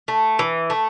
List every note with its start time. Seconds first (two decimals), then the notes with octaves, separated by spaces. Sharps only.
0.08 A3
0.39 E3
0.70 A3